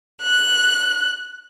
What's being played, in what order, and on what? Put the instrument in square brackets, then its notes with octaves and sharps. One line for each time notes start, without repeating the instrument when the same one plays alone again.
[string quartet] F#6